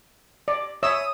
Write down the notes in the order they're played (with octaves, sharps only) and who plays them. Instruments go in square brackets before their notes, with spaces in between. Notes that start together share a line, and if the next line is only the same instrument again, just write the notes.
[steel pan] D5
[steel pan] C#5 E5 E6 [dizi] D#6